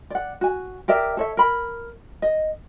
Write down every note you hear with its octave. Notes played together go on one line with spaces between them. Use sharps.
D5 F#5
F#4 G#5
G4 A#4 D5 E5
A4 C#5 E5
A#4 B5
D#5